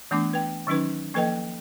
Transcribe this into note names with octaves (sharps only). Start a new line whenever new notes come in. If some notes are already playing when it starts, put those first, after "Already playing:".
E3 A3 B3 D4 D6
B4 G5
D#3 F#3 C#4 D#4 B4
F3 A#3 A4 B4 D#5 G5